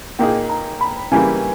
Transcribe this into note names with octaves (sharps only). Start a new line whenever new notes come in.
A#2 A#3 D#4 G#4 G5
A#5
B5
C#3 E3 G3 A#3 G#5